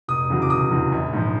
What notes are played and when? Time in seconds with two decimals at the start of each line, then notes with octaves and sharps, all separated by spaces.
0.08 F1 D#6
0.29 E2 C#3 F#3
0.42 D6
0.50 F1 D#6
0.71 E2 C#3 F#3
0.92 A#1
1.13 G#2 F3